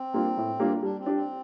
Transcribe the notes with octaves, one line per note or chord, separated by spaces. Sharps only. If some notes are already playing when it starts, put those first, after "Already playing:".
Already playing: C4
G3 A#3 D4 F4
A2
G3 A#3 D4 F4
G3 D4
C4
D4 G4
C4